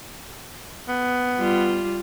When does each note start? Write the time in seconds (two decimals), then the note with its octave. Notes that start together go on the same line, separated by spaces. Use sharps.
0.88 B3
1.39 G3 F4